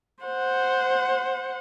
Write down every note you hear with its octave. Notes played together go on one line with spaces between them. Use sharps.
C5 F#5